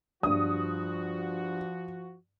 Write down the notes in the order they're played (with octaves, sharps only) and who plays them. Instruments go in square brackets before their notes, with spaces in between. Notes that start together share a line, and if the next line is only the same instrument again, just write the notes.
[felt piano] G2 [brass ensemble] F3 F#4 [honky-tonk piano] D#6